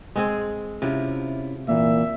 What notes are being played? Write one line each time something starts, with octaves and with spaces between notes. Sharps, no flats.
G#3 C4 G#4
C3 C#4 E4 F4
A#2 E3 A#3 E5